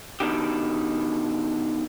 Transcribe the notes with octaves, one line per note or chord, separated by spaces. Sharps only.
B2 D#3 D4 G4